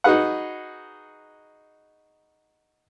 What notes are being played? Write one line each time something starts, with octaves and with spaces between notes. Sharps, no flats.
D#4 F#4 G#4 B4 F#5